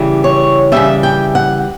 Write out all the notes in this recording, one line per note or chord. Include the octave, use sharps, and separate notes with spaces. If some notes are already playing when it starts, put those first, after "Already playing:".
Already playing: C#3 E3 G3
C#5
C#3 E3 G3 E5
G5
F#5